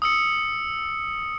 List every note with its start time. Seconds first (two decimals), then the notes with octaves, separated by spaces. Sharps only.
0.02 D#6 E6 C#7